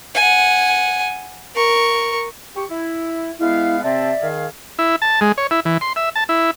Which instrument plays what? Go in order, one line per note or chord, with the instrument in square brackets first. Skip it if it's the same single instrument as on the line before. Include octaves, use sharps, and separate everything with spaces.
[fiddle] F#5 G#5
A#4 C#6
[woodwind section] G4 C#6
E4
[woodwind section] G#3 B3 F5 [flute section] E4
[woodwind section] C3 C4 A5 [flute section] D5 E5
[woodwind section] D#3 G#4 F5
[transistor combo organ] E4
A5
G#3
C#5
E4
E3
C6
E5
A5
E4